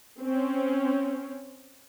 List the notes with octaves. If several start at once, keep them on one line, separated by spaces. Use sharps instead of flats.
C4 C#4